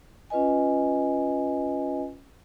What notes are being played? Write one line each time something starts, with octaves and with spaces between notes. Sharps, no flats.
C#4 F4 B4 D#5 G#5